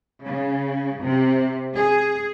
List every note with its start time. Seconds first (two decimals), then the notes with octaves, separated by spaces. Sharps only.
0.25 C#3
1.01 C3
1.75 G#4